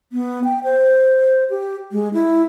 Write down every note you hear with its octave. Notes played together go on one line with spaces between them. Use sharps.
B3
G5
C5
G4
G#3
E4